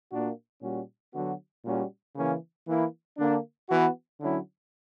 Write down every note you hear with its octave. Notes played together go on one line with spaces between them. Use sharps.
A#2 A#3 D4 F#4
A#2 G3 C#4 F#4
D3 F#3 B3 F#4
A#2 G3 C#4 F#4
C#3 E3 A#3 C#4
E3 A#3 E4
D3 A#3 D4
E3 B3 F#4
D3 F#3 C#4 E4